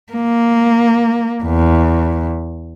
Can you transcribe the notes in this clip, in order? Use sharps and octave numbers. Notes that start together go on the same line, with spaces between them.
A#3
E2